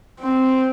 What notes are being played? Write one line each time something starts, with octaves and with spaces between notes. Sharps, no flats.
C4